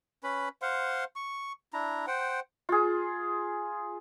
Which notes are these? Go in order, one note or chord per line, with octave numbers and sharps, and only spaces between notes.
C#4 B4 B5
C5 F5 F#5 C6
C#6
D4 E4 A#5
C5 F#5 G5
F4 G#4